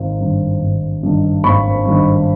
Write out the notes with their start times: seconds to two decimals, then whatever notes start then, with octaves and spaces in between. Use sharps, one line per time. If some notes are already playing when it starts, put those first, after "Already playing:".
Already playing: G#1 D#3
0.20 G2 D#3
0.61 G#1
1.03 G2 D#3
1.44 G#1 B5 C#6
1.86 G2 D#3